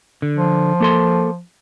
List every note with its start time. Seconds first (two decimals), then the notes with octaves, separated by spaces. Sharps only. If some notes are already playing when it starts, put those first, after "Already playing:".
0.22 D3
0.37 F3
0.80 A#3 A4 C6